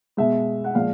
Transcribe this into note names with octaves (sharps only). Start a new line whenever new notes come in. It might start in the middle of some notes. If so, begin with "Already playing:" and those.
B2 G#3 E5
F#5
A#2 F3 G#3 F5